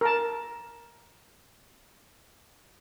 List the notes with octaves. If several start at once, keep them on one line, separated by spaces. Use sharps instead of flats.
A#4 A5